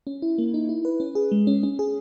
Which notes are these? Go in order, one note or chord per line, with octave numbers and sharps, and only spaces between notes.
C#4
E4
A#3
D#4
E4
B4
C#4
G#4
G#3
C#4
C#4
G#4